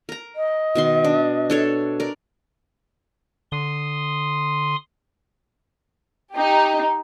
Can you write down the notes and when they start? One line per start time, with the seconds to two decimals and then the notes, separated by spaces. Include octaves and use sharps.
0.09 A#4 A#5
0.35 D#5
0.75 B2 D#3 C6
1.04 D4
1.50 D4 A4 C#5
2.00 A#4 D5
3.52 D3 C6 D#6
6.34 D#4 G4